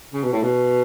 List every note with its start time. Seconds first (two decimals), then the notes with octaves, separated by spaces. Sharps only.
0.13 C#3
0.23 B2
0.33 A2
0.43 B2